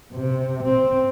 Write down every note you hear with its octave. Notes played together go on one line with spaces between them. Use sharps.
C3
C4